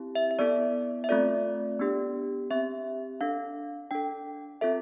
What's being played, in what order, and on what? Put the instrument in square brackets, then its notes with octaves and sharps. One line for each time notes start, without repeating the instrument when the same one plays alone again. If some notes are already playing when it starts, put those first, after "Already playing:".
Already playing: [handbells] C4 E4 G4
E5
E5
B3 E4 A4 D5
E5
A3 C4 F4 A4 D5
B3 D4 G4
C4 G4 E5
D4 A4 F5
D4 A4 G5
C4 F4 A4 E5